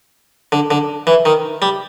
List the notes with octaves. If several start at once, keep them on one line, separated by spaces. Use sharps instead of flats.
D3
D3
E3
D#3
G3